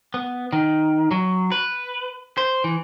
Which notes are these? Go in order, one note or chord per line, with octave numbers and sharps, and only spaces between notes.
B3
D#3
F#3
B4
C5
E3